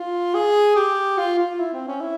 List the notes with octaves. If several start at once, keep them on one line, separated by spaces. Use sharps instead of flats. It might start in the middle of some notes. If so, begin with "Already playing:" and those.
Already playing: F4
G#4
G4
F4
F4
E4
C4
C#4
E4